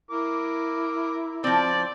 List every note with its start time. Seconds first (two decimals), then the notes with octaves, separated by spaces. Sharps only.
0.11 E4 A#4 D6
1.44 F3 C4 D5